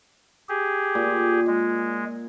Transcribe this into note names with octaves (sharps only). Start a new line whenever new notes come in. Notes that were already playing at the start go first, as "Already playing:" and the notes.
G4 G#4
A#2
G#3